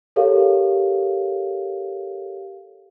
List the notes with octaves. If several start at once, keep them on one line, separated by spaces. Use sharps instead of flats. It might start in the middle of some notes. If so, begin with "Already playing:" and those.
G4 A4 A#4 C#5 F5